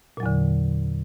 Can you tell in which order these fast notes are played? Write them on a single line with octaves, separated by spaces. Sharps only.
A#2 F#3 E2 D3